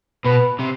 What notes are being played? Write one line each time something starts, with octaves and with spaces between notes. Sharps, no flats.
B2 B4
C3